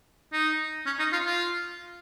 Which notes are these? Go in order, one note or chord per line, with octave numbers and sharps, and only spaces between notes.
D#4
C#4
D#4
F4
F4